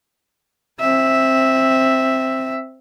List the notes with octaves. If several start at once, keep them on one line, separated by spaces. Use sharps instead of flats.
C4 E5